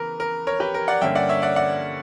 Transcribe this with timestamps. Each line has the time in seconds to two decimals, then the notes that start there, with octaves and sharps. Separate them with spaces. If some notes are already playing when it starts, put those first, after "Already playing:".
Already playing: C#3 E3 B3 A#4 B4
0.20 A#4
0.47 A#4 C#5
0.60 G4 B4
0.74 A#4
0.88 D5 F#5
1.01 G2 D3 A#3 C#4 E5 G5
1.15 D5 F#5
1.29 C#5 E5
1.42 D5 F#5
1.56 D5 F#5